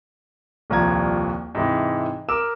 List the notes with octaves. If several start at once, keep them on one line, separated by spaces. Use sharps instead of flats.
D#1 C2 F3 A#5 G#6
G#2 C3 E3 G#3
A#4 D6 E6 E7